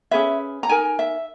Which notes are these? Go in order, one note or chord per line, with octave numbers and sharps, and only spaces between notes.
C#4 G#4 B4 E5
A#5
D#4 A#4 G#5
E5